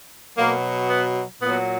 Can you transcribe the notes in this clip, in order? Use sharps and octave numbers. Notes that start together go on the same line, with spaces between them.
B2 F#3 A#3
B3
A#2 F#3 B3